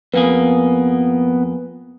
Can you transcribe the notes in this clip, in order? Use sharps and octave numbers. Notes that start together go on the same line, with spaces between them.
F2 A#3 B3 G#4 B4